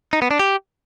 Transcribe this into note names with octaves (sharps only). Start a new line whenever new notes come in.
D#4
B3
D4
G4